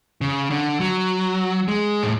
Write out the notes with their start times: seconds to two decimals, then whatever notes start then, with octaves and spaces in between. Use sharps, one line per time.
0.21 C#3
0.51 D3
0.80 F#3
1.68 G#3
2.03 A2